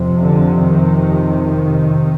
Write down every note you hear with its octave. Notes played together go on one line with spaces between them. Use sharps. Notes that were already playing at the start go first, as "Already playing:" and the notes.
Already playing: F2 C3
D3
D#3